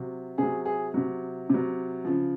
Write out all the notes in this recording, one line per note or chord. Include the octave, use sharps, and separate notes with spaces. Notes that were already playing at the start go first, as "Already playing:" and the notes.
Already playing: C3 F#3
C3 F#3 G#4
G#4
C3 F#3
C3 F#3
C#3 F3